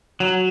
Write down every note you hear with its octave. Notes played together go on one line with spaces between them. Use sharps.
F#3